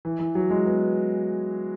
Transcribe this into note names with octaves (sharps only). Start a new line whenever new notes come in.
E3
E3
F#3
G#3
B3